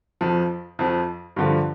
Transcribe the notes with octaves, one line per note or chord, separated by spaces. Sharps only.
F2 F3
F2 F3
G2 D3 F3